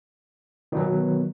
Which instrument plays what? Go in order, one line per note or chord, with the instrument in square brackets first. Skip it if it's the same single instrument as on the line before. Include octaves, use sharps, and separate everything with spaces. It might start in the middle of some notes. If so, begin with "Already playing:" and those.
[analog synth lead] B2 [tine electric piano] D#3 F#3